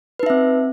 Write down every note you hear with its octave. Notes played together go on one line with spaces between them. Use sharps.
C4 D#4 B4 E5